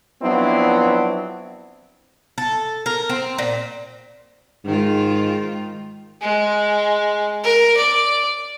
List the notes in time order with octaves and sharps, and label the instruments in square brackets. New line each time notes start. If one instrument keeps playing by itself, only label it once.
[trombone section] F3 F#3 B3 C4 D4 E4
[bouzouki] A4
A#4
C4
A#2
[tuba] G#2 [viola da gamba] D#3 G#3 F4
[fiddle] G#3
A#4
D5